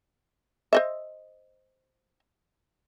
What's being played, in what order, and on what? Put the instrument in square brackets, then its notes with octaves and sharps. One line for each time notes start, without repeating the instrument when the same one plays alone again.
[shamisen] C5 D#5 E5